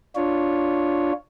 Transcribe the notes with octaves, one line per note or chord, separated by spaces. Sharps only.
D4 F4 C#5